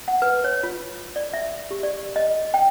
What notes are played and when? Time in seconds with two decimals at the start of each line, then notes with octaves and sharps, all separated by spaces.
0.08 F#5
0.22 B4
0.44 C#5
0.63 F4
1.16 D5
1.34 E5
1.71 G4
1.83 D5
2.16 D#5
2.54 G5